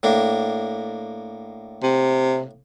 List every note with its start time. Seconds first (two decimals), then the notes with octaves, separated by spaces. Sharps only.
0.03 A2 A#3 D4
1.83 C3